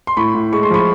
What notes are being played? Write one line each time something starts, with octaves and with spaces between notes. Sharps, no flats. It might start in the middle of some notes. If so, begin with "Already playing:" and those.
C6
A2 B5 C#6
A2
G#3 C#6
C6
F3 B5 C#6